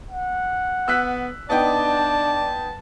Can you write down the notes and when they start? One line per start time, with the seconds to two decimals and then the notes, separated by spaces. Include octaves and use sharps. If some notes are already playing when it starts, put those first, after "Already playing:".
0.10 F#5
0.88 B3 E6 F#6 B6
1.50 B3 D4 D#4 D5 G5 A5